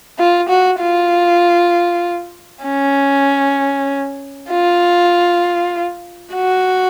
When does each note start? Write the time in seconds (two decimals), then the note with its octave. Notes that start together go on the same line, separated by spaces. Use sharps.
0.19 F4
0.48 F#4
0.80 F4
2.65 C#4
4.50 F4
6.34 F#4